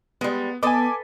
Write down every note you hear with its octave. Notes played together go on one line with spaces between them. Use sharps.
G3 G#3 B3
B3 A4 B4 D#5 G#5 D6